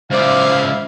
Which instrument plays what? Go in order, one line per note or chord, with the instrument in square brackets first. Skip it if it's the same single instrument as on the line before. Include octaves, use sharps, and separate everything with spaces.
[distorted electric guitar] C#2 D5 [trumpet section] E4 E5 F5 [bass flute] C5